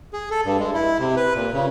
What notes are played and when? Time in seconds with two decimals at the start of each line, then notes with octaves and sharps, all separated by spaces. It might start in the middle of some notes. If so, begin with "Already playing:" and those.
0.13 G#4
0.31 A4
0.45 G2
0.59 G#3
0.74 E4
0.99 C3
1.16 B4
1.34 A#2
1.54 C#3